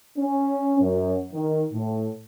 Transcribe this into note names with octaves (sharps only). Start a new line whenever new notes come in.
C#4
F#2
D#3
A2